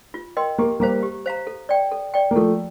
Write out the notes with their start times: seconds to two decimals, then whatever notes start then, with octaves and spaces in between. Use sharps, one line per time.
0.14 F4
0.37 A#4 D#5 G5 C6
0.58 A#3 G4
0.80 G3 A#3 C5 F5 A#5
1.03 G4
1.26 C5 F5 A#5
1.47 A4
1.69 D5 G5
1.91 A4
2.14 D5 G5
2.31 A#3
2.36 F3 A3 A4